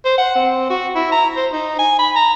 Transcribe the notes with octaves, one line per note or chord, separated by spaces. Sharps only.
C5
F#5
C4
F#4
E4
A#5
C5
D#4
G#5
B5
A#5